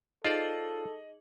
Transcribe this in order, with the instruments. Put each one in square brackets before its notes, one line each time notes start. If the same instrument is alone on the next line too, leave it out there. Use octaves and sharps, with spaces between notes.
[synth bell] D#4 G#4 F#7 [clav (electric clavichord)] F4 C5 D5 [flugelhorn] A4 [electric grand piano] D#5